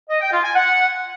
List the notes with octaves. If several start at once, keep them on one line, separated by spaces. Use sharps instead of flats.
D#5
G5
F4
G#5
F#5